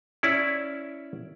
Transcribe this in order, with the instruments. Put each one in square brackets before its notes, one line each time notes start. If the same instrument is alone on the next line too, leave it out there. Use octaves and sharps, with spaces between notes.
[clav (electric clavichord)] C#4 E4 D5